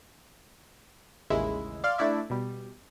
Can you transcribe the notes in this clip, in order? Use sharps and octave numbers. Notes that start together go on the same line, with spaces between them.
A1 D#2 C#3 G#3 E4
D5 F5 C6 F6
A3 D4 E4 D5 E5
B2 G3